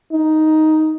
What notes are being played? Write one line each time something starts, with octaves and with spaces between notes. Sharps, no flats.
D#4